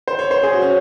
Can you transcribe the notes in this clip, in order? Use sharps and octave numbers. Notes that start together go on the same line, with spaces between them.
C5
C#5
C5
G#4
F#4
C#4